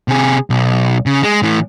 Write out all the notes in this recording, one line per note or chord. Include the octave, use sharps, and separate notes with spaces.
C3 G#4
B1
C#3
G#3
A2 E3